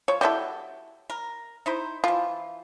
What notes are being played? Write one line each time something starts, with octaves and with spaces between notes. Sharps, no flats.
F3 C#5
G3 E4 F#4 A4 G5
A#4
D#4 E4 C5
E3 F3 F4